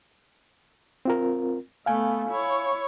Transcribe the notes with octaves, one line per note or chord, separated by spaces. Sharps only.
C4 F4 A#4
A3 B3 F5 G#5
E4 C#5